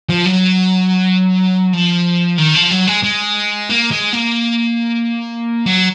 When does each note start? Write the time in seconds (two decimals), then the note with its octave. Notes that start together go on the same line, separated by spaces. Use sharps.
0.09 F3
0.26 F#3
1.73 F3
2.38 D#3
2.55 F3
2.71 F#3
2.87 G#3
3.04 G#3
3.70 A#3
3.91 G#3
4.13 A#3
5.66 F#3